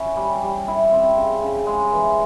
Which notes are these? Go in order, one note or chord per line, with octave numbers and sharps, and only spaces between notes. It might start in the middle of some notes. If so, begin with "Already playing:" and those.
Already playing: C#4 E4
G3
G3
E4
C4
C#3
C#3
G#3
E3